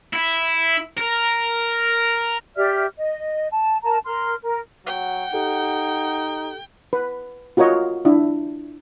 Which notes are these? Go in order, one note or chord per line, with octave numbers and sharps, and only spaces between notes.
E4
A#4
G4 D5 E5 F6
D#5
A5
A#4 A5 A#5
A#4 C6 F6
A#4
F#3 F#5 G5
D#4 G4 A4
B4
F4 F#4 A#4 C#5 D#5
D4 E4